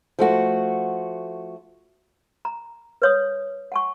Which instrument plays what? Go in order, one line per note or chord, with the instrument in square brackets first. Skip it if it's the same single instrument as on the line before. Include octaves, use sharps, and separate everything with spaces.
[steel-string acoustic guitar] F3 A3 F#4
[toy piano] A#5
B4 C#5 D#6
F#5 G#5 C#6